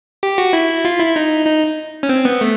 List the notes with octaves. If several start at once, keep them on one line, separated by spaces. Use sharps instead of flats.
G4
F#4
E4
F4
E4
D#4
D#4
C#4
C4
B3
A3